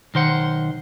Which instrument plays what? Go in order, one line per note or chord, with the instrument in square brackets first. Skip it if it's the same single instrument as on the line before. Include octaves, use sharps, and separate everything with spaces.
[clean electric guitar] B1 D#3 C5 F#5